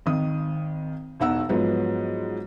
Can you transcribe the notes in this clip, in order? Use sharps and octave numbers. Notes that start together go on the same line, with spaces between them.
G#1 D#3 D#6
E1 B1 D#4 F#5 E6
G#2 F3 F#3 B3